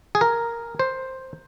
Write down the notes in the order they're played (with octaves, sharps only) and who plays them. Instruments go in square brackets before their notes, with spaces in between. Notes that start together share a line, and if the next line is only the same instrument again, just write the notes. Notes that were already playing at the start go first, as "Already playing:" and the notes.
[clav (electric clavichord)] G#4
A#4
C5